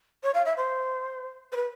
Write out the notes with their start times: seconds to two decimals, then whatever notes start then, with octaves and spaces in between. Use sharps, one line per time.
0.23 C#5
0.34 F5
0.45 E5
0.57 C5
1.52 C5
1.56 B4